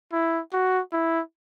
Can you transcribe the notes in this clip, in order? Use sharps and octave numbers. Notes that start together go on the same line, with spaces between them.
E4
F#4
E4